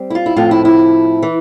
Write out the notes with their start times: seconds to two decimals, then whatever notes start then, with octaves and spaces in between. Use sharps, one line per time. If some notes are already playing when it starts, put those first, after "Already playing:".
Already playing: G3 C4
0.10 E4
0.15 F4
0.26 E4
0.36 A2 F3 C4 F4
0.51 E4
0.65 E4
1.23 E3